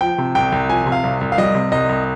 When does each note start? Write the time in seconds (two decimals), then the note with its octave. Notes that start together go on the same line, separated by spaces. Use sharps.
0.01 F3 G5
0.18 C3
0.35 C2 G5
0.52 C2
0.69 F3 G#5
0.86 C3
0.92 F5
1.04 C2
1.21 C2
1.32 F5
1.38 G3 D#5
1.55 C3
1.72 C2 D#5
1.89 C2